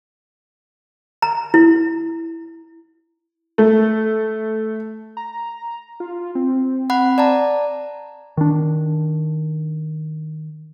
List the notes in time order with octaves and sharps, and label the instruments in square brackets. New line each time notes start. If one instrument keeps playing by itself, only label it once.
[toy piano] A#5
E4
[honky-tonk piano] A3
[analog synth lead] A#5
F4
C4
[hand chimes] F#5 B5 F#6
D5 A5 A#5
[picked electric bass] D#3 D4